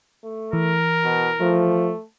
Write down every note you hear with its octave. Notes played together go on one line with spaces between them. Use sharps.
A3
E3 A#4
B2
F3 A3